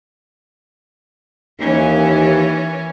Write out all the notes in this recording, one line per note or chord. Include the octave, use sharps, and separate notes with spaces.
D#2 E3 C#4